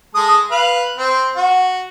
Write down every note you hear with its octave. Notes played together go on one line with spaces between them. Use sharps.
G#3 A4 D#6
B4 F5
C4
F#4